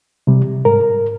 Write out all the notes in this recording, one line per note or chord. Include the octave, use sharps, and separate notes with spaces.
C3 G3
G#2 A#4